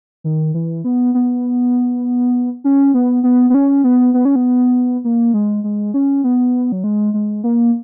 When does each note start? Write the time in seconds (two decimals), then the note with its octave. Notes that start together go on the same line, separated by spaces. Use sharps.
0.24 D#3
0.54 E3
0.84 B3
1.14 B3
2.64 C#4
2.94 B3
3.24 B3
3.50 B3
3.54 C#4
3.84 B3
4.14 B3
4.25 C#4
4.36 B3
5.04 A#3
5.34 G#3
5.64 G#3
5.94 C#4
6.24 B3
6.72 F#3
6.84 G#3
7.14 G#3
7.44 A#3